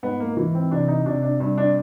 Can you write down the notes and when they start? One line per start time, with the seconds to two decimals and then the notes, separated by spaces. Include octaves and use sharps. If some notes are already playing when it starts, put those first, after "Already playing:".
0.03 G#2 B3
0.20 A#3
0.37 E3
0.55 C4
0.71 C3 D4
0.88 D#4
1.06 C3 D4
1.22 D4
1.40 G2
1.58 D4